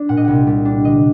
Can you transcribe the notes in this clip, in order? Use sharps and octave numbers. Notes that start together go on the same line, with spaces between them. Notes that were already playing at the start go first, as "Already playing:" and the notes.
Already playing: D4
A#2 F#5
D#5
C2 F#5
G3
D4
D3 D#5